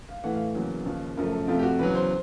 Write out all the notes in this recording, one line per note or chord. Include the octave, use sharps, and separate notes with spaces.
F5
A2 E3 A3 F#5
F5
E2 C#3 F#3 A#3
D#2 C#3 F3
F#2 C#3 F3 A3 A#4
A4
F2 C3 F3 A3 F4
G4
F#4
E2 C#3 F#3 B4
C5